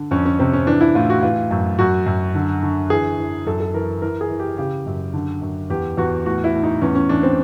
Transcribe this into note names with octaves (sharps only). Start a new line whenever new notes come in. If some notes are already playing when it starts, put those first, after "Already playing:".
Already playing: D3
F2 C#4
C#4
C3 C4
C#4
E3 D4
E4
A2 F4
F#4
E3 F4
F#2
F#2 F#4
F#2
D3
D3
E3 G#4
E3
F#2 A4
A4
E3 A#4
E3 A#4
G#4
E3
G4
C#3 G4
F#2
D3
F#2
E2 G4
E2 F#4
A2 F#4
E4
A2
D#4
E2 C#4
C#4
E3 D4
C4